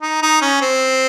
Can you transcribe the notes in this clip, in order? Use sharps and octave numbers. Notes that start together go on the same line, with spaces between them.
D#4
D#4
C#4
C4